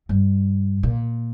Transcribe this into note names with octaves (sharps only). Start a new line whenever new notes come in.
G2
A#2